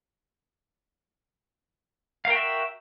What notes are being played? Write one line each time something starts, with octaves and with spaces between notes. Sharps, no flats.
F#4 A#4 E5 F5 G5